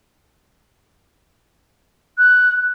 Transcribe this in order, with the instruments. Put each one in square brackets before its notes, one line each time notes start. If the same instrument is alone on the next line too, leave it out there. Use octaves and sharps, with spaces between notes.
[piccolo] F#6